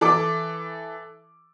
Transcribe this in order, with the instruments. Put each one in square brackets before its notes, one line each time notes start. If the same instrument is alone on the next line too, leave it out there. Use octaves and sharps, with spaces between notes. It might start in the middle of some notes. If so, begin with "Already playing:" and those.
[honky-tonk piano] E3 A4 D6